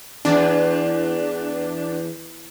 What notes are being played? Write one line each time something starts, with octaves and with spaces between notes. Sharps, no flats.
E2 D4